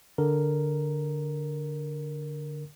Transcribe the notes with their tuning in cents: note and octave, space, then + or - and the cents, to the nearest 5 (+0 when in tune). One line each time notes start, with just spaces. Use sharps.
D3 +0 A#4 +0